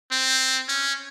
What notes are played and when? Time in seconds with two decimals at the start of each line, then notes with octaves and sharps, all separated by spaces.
0.11 C4
0.68 C#4